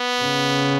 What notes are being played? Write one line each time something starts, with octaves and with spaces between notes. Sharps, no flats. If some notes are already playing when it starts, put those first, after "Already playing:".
Already playing: B3
C#3